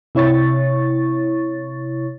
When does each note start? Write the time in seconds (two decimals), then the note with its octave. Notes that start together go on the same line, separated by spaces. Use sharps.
0.15 C3 E4 C#5 C#6 A6